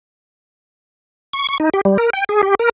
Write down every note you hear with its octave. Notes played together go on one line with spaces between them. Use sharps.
C#6
C#6
D#4
G4
G3
A#4
G5
G#4
G4
A#4